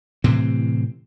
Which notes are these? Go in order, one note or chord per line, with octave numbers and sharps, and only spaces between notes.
A2 C3 E3 C4